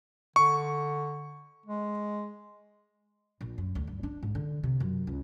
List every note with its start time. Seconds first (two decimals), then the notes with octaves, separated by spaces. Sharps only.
0.36 D3 C#6
1.66 G#3
3.41 A#1
3.58 F#2
3.75 D2
3.87 G2
4.03 D4
4.23 G#2
4.35 D3
4.64 C3
4.80 F#2
5.07 C#2